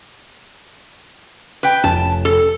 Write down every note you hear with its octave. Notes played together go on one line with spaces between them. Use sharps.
B4 G5
F1 F2 C#4 A5
A4